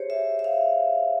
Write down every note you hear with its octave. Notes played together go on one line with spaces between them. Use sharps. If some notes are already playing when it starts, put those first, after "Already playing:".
Already playing: G4 G#4 C5 C#5
E5
E5
F5